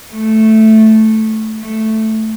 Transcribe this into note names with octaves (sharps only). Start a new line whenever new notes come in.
A3
A3